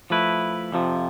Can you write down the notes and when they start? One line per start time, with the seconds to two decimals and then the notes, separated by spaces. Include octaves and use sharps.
0.10 F3 A3 E4 B4
0.72 F2 C3 F3